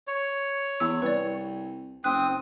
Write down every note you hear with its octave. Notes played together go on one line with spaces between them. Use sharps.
C#5
E2 E6
C2 B4 D5
F#1 C4 D#6 F#6